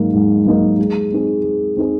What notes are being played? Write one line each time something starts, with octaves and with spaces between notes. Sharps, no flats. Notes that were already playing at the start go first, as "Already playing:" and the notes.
Already playing: G#2 F#3 A#3 D#4 A#4
G#2
F#3 A#3 D#4 A#4
G#3
C4 D#4 G#4
G#3
C4 D#4 G#4